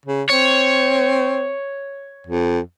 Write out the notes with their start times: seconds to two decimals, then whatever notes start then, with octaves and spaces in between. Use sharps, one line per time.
0.05 C#3
0.29 C4 C#5
2.27 F2